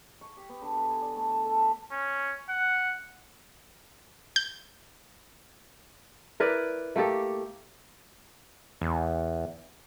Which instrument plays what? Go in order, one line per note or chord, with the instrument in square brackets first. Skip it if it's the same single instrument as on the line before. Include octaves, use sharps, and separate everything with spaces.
[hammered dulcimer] C#6
G4
B3
D3
B4
G#5
D5
A3
A5
A4
B5
[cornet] C#4
F#5
[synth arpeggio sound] G6
[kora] E4 A#4 B4 D5
A3 A#3 G4 A4
[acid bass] E2